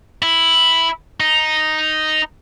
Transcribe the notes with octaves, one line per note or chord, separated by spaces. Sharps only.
E4
D#4